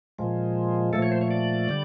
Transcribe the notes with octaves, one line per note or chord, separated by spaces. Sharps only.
A#2 F3 G#3
A#2 F3 A3 A4
C#5
C5
C#5
D5
D3 G3